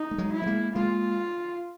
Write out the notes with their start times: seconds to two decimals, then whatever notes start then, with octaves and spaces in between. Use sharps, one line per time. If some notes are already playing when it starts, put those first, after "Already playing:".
Already playing: D#4
0.11 A3
0.18 F#3 G#3
0.33 E4
0.42 A3
0.46 G#3 A#3
0.75 G#3 A#3 F4